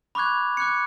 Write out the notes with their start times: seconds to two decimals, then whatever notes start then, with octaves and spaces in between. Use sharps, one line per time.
0.15 B5 C#6 D6 F#6 G#6
0.57 D6 F#6 G#6 C#7